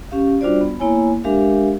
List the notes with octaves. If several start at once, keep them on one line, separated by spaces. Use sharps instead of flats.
C#4 G4 F5
G3 D4 F4 F#4 C5 D5
B3
A#3 B3 E4 C#5 G#5
G#3 D4 G4 A#4 E5 F5